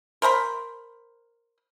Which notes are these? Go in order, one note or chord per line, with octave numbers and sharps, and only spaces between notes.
A#4 C5 A#5 B5